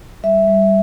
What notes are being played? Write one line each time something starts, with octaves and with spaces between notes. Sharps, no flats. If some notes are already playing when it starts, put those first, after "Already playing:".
G3 E5
G3